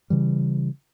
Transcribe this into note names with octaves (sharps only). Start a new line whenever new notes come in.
C#3 E3 G3